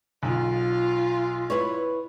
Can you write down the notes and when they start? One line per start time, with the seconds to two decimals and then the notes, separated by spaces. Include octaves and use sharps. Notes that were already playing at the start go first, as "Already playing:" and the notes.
0.23 B1 F4
1.50 E4 B4 C#5